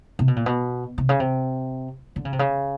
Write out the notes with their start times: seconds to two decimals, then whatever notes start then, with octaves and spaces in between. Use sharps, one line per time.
0.19 C3
0.28 B2
0.36 A#2
0.46 B2
0.98 C3
1.09 C#3
1.20 C3
2.16 D3
2.25 C#3
2.33 C3
2.39 C#3